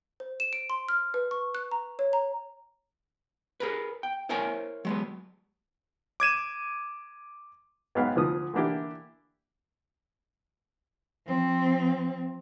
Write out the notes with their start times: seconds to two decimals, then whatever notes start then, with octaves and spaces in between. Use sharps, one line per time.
0.20 C5
0.40 E7
0.53 D7
0.70 C6
0.89 F6
1.14 B4
1.31 C#6
1.55 F#6
1.71 A#5
1.99 C#5
2.13 A#5
3.60 G#4 A#4 B4
4.03 G5
4.29 E4 A#4 C5 C#5 G#5
4.85 F#3 G#3 B3
6.20 D6 G#6 D#7 E7
7.95 G#2 F#3 B3 F5 G5
8.16 D2 F3 D#6
8.54 D3 E3 A#3 D4 E4 G4
11.27 F3 C4